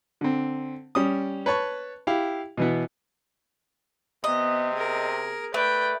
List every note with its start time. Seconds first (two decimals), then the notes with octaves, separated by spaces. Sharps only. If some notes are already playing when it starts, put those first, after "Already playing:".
0.21 D3 C4
0.95 G3 C#4 D#6
1.46 B4 C#5 A5 C#6
2.07 E4 G4 F5
2.57 B2 E3 B3
4.24 C3 B3 D#5
4.74 G#4 A#4
5.54 A3 B4 D5 G5